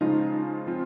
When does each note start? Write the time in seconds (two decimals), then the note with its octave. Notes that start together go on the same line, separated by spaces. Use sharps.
0.01 C#3 F3 G#3 C#4 D#4 F4
0.67 F3 C4 F4